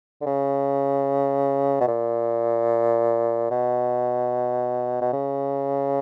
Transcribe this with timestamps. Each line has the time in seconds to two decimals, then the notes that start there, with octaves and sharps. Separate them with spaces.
0.21 D3
0.26 C#3
1.80 B2
1.88 A#2
3.50 B2
5.01 B2
5.13 C#3